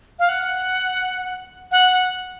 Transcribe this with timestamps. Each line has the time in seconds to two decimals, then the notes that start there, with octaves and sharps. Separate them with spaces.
0.19 F5
0.29 F#5
1.72 F#5